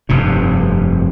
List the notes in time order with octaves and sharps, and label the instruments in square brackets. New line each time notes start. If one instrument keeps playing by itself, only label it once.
[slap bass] F1 G2 C3